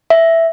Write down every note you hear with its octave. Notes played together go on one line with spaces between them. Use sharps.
E5